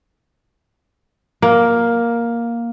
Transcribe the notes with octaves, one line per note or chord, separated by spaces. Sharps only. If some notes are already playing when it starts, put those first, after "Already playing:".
A#3